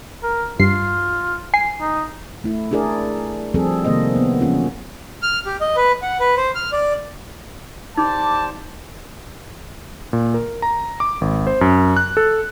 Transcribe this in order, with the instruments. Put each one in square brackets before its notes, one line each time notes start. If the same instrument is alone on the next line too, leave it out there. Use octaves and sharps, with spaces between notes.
[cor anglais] A#4
[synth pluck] G2 C7 [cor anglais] F4
[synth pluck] G#5 C7
[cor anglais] D#4
[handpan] A3 E4
D4 E4 G#4 A#4 D5
F3 G3 C4 G#4 A4
C3 D#3 A#3 C4 C5 D#5
B3
E3 F#3 C#4 F4
[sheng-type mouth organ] F6
G4
D#5
B4
F#5
B4
C5
F6
D5
[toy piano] D#4 [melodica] G4 C5 D5 [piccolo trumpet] A5
[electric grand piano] A#2
A#4
A#5
D6
G#1
C5
F#2
F#6
A4